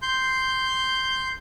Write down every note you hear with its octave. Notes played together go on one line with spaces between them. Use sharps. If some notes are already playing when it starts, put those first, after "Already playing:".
C6 G6